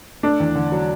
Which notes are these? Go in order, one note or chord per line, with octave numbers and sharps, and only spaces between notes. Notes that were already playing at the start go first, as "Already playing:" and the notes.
A3 D4
E2
D3
F#3